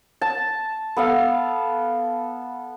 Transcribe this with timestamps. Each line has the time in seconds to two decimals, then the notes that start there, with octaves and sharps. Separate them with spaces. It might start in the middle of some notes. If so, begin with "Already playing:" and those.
0.22 A5
0.97 B3 A4 F5